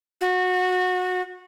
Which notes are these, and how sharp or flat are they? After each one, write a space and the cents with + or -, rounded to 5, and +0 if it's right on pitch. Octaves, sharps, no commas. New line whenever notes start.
F#4 -20